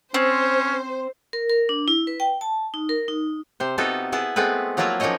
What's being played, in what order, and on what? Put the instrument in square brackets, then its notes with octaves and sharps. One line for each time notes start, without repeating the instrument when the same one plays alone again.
[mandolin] C4 [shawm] C#4 [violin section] C5
[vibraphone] A#4
A#4
D4
E4
B4
G5
A5
D#4
A#4
D#4
[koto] C3 C5
C3 B3 D#4 F4 F#4 A4
B3 E4 G#4 A5
G#3 A3 B3 C4 B4
F3 F#3 A#3 E4 F4 E5
F3 A#3 C#4 D#4 C#5 D#5